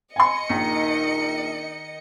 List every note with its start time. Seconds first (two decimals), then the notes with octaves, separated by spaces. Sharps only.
0.16 D#5 G#5 C6 C#7
0.49 A#1 D#3